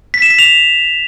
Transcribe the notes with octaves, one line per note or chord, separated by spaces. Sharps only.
B6
E7
B6
F7